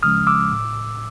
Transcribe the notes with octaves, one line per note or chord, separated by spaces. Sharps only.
D2 C#3 F3 G#3 C#4 D#6 F6
D6 E6
A2